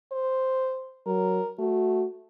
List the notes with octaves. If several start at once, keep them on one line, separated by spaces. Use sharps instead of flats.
C5
F#3 A#4
A3 F#4